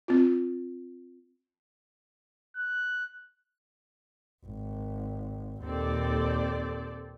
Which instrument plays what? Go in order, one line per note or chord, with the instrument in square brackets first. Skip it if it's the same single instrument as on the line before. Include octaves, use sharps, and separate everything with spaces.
[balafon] C4 F4
[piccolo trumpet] F#6
[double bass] G#1
[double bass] D#2 A#2 [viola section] C4 A4 D5